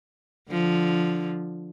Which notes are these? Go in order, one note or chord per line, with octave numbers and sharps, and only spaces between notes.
D3 F3